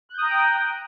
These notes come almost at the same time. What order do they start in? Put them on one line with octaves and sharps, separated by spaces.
F#6 G6 D#6 A#5 G5